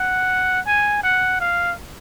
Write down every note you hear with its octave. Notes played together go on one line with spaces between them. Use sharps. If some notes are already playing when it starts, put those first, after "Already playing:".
Already playing: F#5
G#5
F#5
F5